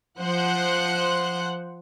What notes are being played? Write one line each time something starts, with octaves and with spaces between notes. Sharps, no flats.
F3 C5 F#5 F#6